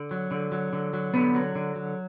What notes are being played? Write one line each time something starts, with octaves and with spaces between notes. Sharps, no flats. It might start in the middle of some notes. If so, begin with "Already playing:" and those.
Already playing: D3
F#3
D3
F#3
D3
F#3
D3 B3
F#3
D3
F#3